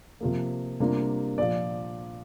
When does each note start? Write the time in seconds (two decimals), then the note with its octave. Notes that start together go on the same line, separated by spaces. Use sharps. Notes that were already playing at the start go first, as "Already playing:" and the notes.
0.21 C3 F3 A#3
0.80 C3 G3 A#3 D4 F4
1.38 A#2 F3 D5